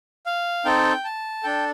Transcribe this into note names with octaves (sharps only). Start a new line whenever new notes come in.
F5
C4 D#4 A4 G5
A5
D4 A4 G5